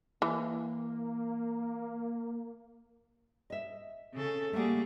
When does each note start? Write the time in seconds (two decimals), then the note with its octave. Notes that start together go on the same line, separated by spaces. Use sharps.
0.22 E3 A#3
3.50 D#5 E5
4.13 C#3 C#4 A4
4.53 G3 A3 A#3 G#4 F#5